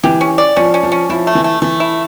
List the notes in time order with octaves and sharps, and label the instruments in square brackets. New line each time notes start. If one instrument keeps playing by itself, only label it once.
[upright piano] E3 [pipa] G4
[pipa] C#4
D5
[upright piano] F3 [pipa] C#4
[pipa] C#4
[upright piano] F3
[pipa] C#4
[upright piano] F3 [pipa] E4
[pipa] A3
[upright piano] E3
[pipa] A3
[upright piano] E3 [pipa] A3
[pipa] E4